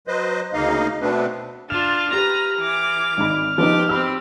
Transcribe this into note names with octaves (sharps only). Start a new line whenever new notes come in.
F#3 B4 C5 D#5
D2 C#3 A#3 D#4 D#5 F5
B2 A3 B3 C4 D4 B4
D4 F4 F6 E7
G4 B4 A#5
E3 D6
G#1 D#4 B5
F3 B3 D#4 G4 D6
C4 G4 B5 E6